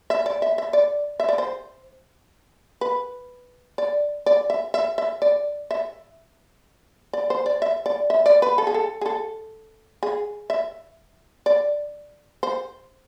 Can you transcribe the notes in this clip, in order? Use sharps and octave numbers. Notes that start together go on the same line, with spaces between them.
E5
D5
E5
E5
D5
E5
D5
C5
B4
D5
D5
E5
E5
E5
D5
E5
D5
C5
D5
E5
D5
E5
D5
B4
A4
G#4
A4
G#4
A4
G#4
E5
D5
C5